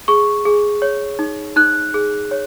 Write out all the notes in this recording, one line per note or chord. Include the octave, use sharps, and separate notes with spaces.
G#4 C#6
G#4
C#5
D#4
D#4 F#6
G#4
C#5